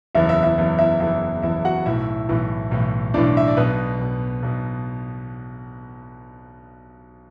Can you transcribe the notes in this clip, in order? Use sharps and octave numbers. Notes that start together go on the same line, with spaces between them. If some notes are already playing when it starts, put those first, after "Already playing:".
F#1 E2 E3 E4 E5
E4 E5
E4 E5
F#1 E2 E3
E4 E5
F#1 E2 E3 E4 E5
F#1 E2 E3 E4 E5
F#4 F#5
B1 A2 E3 E4 E5
B1 A2 E3
B1 A2 E3
B1 A2 E3 D4 D5
E5
D5
B1 B2 B3 B4
B1 B2
B1 B2